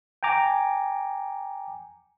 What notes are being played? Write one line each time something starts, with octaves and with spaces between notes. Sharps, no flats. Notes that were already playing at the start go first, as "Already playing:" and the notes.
G5 G#5 A#5 D6